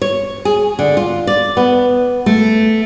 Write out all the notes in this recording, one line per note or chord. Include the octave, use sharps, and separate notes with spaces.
C#5
G#4
D3
F4
D5
B3
A3